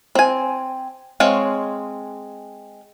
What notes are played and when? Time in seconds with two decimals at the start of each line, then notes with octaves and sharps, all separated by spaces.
0.15 C4 G#5
1.20 G#3 C4 C#5 F5